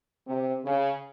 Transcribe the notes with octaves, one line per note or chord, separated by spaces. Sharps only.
C3
C#3